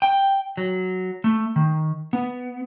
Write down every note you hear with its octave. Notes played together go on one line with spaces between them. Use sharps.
G5
F#3
A3
D#3
B3